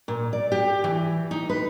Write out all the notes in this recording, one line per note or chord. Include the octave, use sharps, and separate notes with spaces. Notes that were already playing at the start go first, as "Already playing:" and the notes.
A#2
D5
G4
E3
D#4
B4